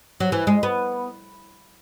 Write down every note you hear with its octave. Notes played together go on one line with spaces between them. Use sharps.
F#3
E3
G#3
B3